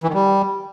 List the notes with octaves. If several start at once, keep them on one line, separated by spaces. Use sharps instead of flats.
E3
D#3
G3